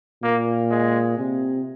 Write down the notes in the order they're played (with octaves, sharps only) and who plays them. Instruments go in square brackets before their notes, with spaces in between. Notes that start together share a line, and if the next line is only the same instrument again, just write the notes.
[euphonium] A#2 [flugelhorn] A#3
[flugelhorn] G#3
[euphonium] C3